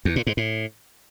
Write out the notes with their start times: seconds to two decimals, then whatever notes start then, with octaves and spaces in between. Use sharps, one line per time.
0.05 E2
0.16 A#2
0.27 G#2
0.37 A2